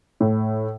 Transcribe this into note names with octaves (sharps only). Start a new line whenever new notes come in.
A2